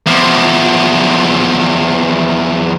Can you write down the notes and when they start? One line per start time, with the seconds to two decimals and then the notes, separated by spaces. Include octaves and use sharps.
0.07 E2 F3